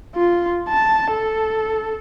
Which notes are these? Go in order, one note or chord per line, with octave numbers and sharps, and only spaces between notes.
F4
A5
A4